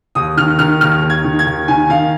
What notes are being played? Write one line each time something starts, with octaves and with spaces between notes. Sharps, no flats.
D#2 D#6
D#3 F6
D#3 F6
D#2 F6
D#2
G#6
D#3
G#6
D#2
D#3 G#5
D#3 F5